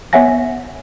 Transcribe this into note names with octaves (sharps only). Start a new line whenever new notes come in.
B3 C#5 E5 F#5 G#5 A#6